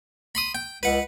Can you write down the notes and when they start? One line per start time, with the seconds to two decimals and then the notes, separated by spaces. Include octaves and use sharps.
0.35 B5 C6 D#6
0.55 G5
0.83 C#2 B4 F#5